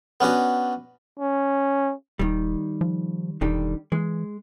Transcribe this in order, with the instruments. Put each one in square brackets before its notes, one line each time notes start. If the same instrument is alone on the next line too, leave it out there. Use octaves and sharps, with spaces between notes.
[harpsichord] B3 C#4 D4 F#4
[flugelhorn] C#4
[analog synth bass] D#1 [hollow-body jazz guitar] D#3 G3
[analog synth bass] F3
[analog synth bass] E1 [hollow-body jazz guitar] D3 D#3 G3
[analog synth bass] E3 [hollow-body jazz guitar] G#3